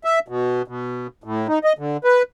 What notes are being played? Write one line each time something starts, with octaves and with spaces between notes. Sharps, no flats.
E5
B2
B2
A2
D#4
D#5
D3
B4